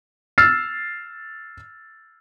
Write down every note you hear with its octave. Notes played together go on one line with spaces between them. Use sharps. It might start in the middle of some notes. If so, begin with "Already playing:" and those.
E6 F6 A6 C7